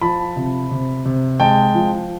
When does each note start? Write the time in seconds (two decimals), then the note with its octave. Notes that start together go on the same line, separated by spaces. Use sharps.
0.01 F3 A5 B5
0.36 C3
0.71 C3
1.05 C3
1.40 G#3 G5 A5
1.75 F3